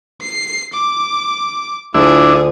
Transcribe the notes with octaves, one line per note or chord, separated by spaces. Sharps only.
C7
D6
D2 D4 E4 F4 G#4